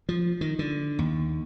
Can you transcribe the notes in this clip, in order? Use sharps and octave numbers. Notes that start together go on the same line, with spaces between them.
F3
D#3
D3
D#2